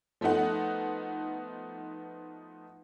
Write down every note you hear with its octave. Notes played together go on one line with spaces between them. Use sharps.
F3 A3 B3 D#4 F#5